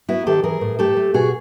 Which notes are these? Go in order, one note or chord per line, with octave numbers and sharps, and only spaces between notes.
B3 E4 F#4
D#3 G4 A4
E3 G#4 A#4
A2
A3 G4 A4
A3
B2 F#4 G#4